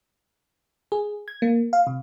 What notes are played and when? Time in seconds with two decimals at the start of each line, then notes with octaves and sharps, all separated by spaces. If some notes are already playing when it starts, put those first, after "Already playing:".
0.92 G#4
1.28 G#6
1.42 A#3
1.73 F5
1.87 C3